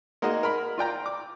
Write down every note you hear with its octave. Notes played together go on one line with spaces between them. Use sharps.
G#3 A#3 D#4 F#4 D#5
A#4 B5
F4 D5 G5 A#5
D6